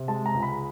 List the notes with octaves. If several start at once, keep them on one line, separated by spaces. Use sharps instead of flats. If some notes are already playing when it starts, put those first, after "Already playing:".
Already playing: C3
G#3 A5
A#5
C#2
B5